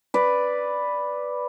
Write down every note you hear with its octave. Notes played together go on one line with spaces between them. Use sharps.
B4 D5